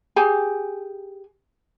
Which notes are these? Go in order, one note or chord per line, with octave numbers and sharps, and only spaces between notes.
G4 G#4 G#5